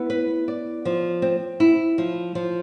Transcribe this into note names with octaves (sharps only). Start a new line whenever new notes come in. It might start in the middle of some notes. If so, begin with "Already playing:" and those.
Already playing: B3 E4
B4
D5
F3
C4
E4
F3
F3